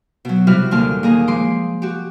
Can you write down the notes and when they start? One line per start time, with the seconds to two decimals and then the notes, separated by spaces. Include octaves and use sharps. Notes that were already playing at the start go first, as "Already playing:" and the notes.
0.25 B2 F#3
0.47 C3 G3 E4 F#4 B4 F6
0.71 D#2 A#2 D3 F4 A5 F6
1.03 D#2 A#3 G#4 D#5 A#5
1.27 F3 G#3 C6 D6
1.82 F#4 G4